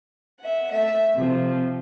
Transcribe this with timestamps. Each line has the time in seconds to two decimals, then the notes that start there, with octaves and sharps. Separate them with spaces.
0.40 E5 F#5
0.71 A3 E5
1.15 C3 F3